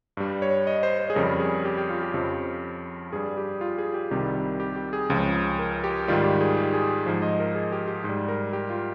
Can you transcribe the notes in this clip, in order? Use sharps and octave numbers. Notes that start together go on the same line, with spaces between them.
G2 G3
C#5
D#5
C5
C5
G#4
F2 C#3 G3 A#4
G#4
G4
G4
F4
G4
F2 C#3 F3
G2 G3 G#4
G4
F4
G#4
G4
C2 C3 D#3 G3 G4
G4
G4
G#4
C#2 C#3 F3
A#4
G4
G#2 D#3 G3 F4
G4
G#4
G4
G#4
G#2 F3 C5
D#5
A#4
G#4
G4
G4
G#2
G3
A#4
G4
F4